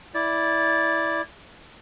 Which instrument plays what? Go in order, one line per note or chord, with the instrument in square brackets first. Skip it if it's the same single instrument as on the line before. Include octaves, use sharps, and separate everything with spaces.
[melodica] E4 D5